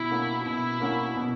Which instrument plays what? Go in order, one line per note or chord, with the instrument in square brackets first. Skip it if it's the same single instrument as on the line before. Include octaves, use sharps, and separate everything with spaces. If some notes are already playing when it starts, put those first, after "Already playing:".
Already playing: [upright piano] B2 F#4 [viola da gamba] E4
[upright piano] A#3 C#4 F#4
[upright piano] B2 [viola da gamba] E4
[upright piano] A#3 C#4 F#4
B2